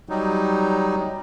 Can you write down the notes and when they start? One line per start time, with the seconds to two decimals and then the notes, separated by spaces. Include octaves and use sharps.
0.09 F#3 G3 D#4